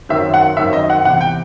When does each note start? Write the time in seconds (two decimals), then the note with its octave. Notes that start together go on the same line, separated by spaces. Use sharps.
0.09 F#2 D#3 F#3 C4 E5
0.34 F#5
0.57 F#2 D#3 F#3 C4 E5
0.73 D#5
0.90 F#5
1.05 E2 C3 E3 F#5
1.21 G5